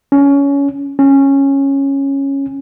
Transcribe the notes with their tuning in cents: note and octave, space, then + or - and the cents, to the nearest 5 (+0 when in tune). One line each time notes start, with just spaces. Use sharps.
C#4 +20
C#4 -10